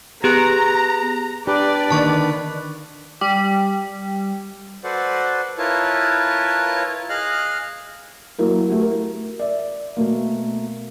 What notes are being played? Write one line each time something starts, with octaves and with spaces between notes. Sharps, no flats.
B3 G4 G#4 A#5 F#6
D4 G4 B4 D5
D3 D#3 A#3 A5 C#6
G3
F#4 A4 B4 C5 D5 F#5
E4 F4 A#4 B4 C#5 A5
G#4 D#5 F5 F6 F#6
F#3 A#3 E4 A#4
A3 F#4 G4
A#4
D5 E5
B2 A3 A#3